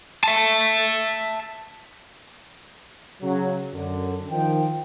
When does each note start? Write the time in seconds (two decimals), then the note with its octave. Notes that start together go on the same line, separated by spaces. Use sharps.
0.24 E5 A5
3.22 C#3 F#3
3.73 F#2 D3
4.30 D#3 F3 G5